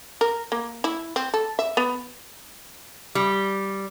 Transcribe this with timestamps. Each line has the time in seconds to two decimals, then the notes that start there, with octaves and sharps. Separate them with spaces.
0.21 A#4
0.52 A#3
0.84 E4
1.16 C4
1.34 A4
1.59 E5
1.77 B3
3.15 G3